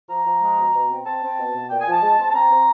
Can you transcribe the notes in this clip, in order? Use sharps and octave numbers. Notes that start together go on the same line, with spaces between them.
F3 A#5
F3
G#3
B2
B2
C4
C4 A5
C4
B2
B2
A#2 G5
G#5
F3 A5
G#3
C4
A5
C4 A#5
C4